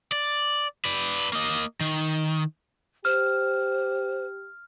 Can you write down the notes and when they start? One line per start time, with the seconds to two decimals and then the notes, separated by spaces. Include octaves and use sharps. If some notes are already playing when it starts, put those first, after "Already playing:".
0.12 D5
0.85 B4 D5
1.33 A#3 D#5
1.81 D#3
3.05 G4 C5 F6